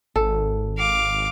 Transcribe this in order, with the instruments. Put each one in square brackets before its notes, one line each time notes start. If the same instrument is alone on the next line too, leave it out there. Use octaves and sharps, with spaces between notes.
[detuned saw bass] G#1 [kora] A4
[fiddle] F5 D6